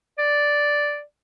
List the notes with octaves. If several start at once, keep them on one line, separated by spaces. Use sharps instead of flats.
D5